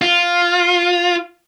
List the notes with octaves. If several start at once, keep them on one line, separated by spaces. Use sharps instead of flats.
F4